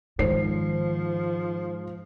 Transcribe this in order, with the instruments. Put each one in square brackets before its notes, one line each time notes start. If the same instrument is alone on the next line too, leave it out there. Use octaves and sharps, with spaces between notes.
[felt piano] G#2 C5 C7 [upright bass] D#3 [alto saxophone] F3